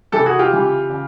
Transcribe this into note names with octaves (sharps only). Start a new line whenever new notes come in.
C3 E3 G3 G4 A4
F#4 G#4
F4 G4
C#3 E3 G3
C#3